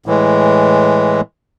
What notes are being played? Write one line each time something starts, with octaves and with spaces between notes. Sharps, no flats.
A2 E3 G#3